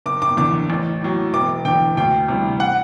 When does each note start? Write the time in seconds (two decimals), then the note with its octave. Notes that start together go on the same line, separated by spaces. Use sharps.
0.06 F#1 D6
0.22 D6
0.37 E2 D3 D6
0.70 A1
1.02 A2 F#3
1.33 E1 D6
1.65 E2 D3 G5
1.97 D2 G5
2.28 C3 E3 G3
2.60 F#5